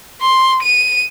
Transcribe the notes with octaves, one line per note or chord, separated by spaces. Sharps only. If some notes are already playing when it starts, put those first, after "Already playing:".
C6
D#7